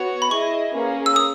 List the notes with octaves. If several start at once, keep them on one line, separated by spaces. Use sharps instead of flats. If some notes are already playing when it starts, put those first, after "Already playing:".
Already playing: B3 F#4 C#5
B5
E4 G#4 D#5 C#6
A#3 C#4 G#4 B4
E6
D#6